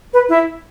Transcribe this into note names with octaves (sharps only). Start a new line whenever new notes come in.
B4
E4